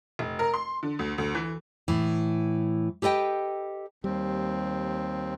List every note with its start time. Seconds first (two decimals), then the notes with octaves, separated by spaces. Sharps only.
0.19 F1
0.39 A#4
0.54 C6
0.83 D3
0.99 D2
1.18 D2
1.35 E3
1.88 A2 E3
3.02 G4 A4 B4 D#5 G5
4.04 D#2 G3 C4